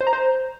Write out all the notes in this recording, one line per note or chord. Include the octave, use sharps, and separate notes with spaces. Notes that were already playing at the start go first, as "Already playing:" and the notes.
C5
A#5
C5